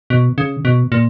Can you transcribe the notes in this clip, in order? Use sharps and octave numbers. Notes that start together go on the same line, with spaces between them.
B2
C#3
B2
A#2